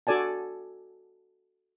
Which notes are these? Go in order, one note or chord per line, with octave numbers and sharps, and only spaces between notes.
F#4 A4 D5 G#5 A5